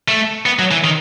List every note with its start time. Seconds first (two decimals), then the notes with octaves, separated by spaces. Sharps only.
0.08 A3
0.46 B3
0.59 F#3
0.71 E3
0.84 D#3